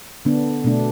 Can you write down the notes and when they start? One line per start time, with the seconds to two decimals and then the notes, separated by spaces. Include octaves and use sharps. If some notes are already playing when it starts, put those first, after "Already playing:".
0.25 D3 B3 D4
0.64 B2 A3 D4